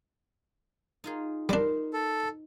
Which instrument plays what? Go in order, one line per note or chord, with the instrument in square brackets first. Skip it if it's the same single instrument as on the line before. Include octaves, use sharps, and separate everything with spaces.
[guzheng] D#4 F4 G#4
[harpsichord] G3 D4 [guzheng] D#4 A#4 C5
[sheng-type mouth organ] A4